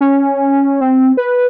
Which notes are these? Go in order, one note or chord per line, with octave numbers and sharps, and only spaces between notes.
C#4
C4
B4